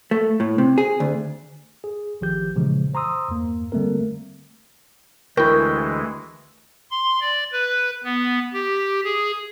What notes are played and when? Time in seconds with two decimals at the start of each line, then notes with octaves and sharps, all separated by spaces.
0.11 A3
0.40 A2
0.58 C3
0.78 G#4
1.00 D2
1.84 G#4
2.21 A1 D#3 F3 G4 G6
2.56 A#2 C#3 E3 F3 G#3
2.94 C5 A#5 C6 D#6 E6
3.28 E2 G2 A#3
3.72 D3 G3 A3 A#3 C4 A#4
5.37 D2 E3 G#3 E4 A#4 G5 C#6
6.91 C6
7.21 D5
7.52 B4
8.04 B3
8.54 G4
9.04 G#4